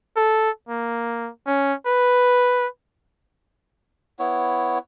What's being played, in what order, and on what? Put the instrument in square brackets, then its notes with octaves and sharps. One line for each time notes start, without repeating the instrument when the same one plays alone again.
[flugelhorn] A4
A#3
C#4
B4
[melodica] B3 E4 C#5